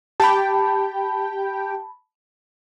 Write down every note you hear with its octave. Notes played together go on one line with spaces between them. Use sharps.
G4 G5 A5 B5